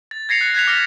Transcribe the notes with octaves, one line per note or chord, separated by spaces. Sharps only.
A6
G#6 A#6 C7 C#7 F7
F#6
F#6 G#6 B6 F7
D6 F6 A#6 B6 C#7 F7